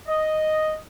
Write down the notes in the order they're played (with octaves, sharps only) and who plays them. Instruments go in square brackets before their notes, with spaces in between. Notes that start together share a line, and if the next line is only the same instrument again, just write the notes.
[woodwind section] D#5